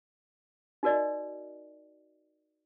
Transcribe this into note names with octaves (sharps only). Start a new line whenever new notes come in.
D#4 F#4 A#4 D5 D#5